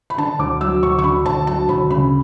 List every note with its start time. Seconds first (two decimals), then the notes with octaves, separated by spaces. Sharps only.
0.10 B5
0.18 D3 A5
0.39 D2 D6
0.61 F#3 E6
0.83 D2 C#6
0.99 C#6
1.04 D3 B5
1.26 D2 A5
1.47 F#3 A5
1.69 D2 B5
1.90 C#3 B5